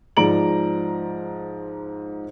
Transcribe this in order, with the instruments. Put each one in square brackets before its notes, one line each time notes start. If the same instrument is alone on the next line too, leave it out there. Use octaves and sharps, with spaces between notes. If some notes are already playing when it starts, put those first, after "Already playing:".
[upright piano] G#2 F3 D5 A#5 D7 F#7